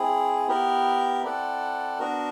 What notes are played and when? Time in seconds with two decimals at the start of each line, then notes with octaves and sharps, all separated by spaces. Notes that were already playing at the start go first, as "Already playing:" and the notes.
Already playing: C4 E4 G#4
0.48 B3 E4 G4 A#4
1.23 C4 E4 A4 D5 F#5
1.99 B3 D4 F#4 A#4